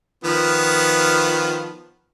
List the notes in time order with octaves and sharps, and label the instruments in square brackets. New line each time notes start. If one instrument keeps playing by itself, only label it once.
[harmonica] D#3 F3 B3